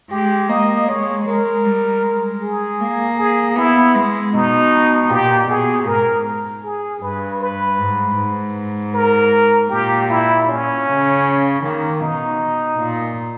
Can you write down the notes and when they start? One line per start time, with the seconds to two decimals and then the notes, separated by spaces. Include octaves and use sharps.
0.11 G#3 G4
0.49 A#3 D#5
0.88 G#3 C#5
1.26 G#3 A#4
1.65 G3
2.03 G#3
2.42 G#4
2.80 A#3
3.18 G#4
3.56 B3 E4
3.95 G#3
4.33 B2 D#4
5.10 A#2 G4
5.48 B2 G#4
5.87 G#2 A#4
6.64 G#4
7.02 G2 B4
7.41 B4
7.78 G#2
8.17 G#2
8.94 A#4
9.71 A#2 G4
10.10 E4
10.48 C#4
10.86 C#3
11.63 D#3 A#3
12.01 B2 D#4
12.78 A#2